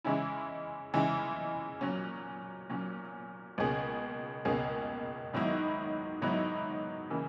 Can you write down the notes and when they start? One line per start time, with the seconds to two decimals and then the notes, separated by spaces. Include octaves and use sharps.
0.04 C#3 E3 G#3 C#4 E4
0.94 C#3 E3 G#3 C#4 E4
1.81 A#2 F#3 C#4
2.70 A#2 F#3 C#4
3.58 C#2 B2 A#3 C#4 G#4
4.45 C#2 B2 A#3 C#4 G#4
5.34 G#2 D#3 F#3 B3 E4
6.21 G#2 D#3 F#3 B3 E4
7.10 C#3 E3 A#3